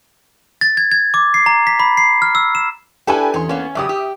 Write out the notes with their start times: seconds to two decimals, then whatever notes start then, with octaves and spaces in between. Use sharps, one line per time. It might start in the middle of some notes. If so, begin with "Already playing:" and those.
0.61 A6
0.77 G#6
0.92 G#6
1.14 D6
1.34 C7
1.46 A#5
1.67 B6
1.79 B5
1.97 C7
2.22 F6
2.35 E6
2.55 E7
3.07 D4 E4 G4 A4 B4 G#5
3.34 E2 C#4 C6
3.49 A#3 B3 C#4
3.75 F#2 C#3 G4 E5 D6 D#6
3.89 G4